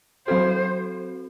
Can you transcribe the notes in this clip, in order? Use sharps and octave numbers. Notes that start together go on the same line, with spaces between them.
F#3 C4 F#4 A4 C5